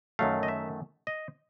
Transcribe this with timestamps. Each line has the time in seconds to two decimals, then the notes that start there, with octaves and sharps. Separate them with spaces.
0.19 F#2 D#3 F#3 A3 F5
0.43 D#5
0.48 E5
1.07 D#5